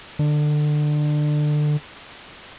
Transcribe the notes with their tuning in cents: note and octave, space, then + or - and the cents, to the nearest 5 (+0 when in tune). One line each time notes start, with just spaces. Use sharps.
D3 +25